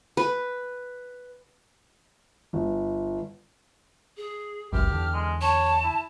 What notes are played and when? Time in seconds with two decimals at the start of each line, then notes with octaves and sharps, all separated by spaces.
0.17 B4
2.53 G1
4.17 G#4
4.73 G1 C#2 F#2 G4 F6
4.89 E2 D3
5.13 G#3
5.41 C#5 A5
5.84 E4